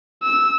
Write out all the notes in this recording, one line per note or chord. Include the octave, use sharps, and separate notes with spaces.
E6